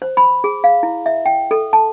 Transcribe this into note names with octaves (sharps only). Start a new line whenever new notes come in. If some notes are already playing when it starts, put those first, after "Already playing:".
C5
B5
G#4
F5
E4
E5
G5
A4
A5